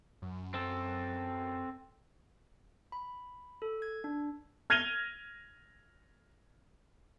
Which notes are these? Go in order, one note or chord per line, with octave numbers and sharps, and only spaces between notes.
F#2
C4 A4
B5
A4
G#6
D4
F6 G#6 A#6 D#7 F7 G7